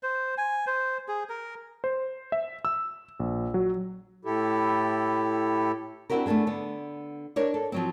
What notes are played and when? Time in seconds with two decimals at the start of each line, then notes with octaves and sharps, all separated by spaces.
0.03 C5
0.38 G#5
0.67 C5
1.08 G#4
1.29 A#4
1.84 C5
2.32 E5
2.65 E6
3.20 A#1
3.54 F#3
4.25 A2 E4 G4 A4
6.10 C4 D4 E4 F#4 G4 A#4
6.26 A3 B3 C4 D4 G#4
6.47 D3 B3
7.36 D4 A#4 C#5 D5
7.54 A4
7.72 F3 F#3 C4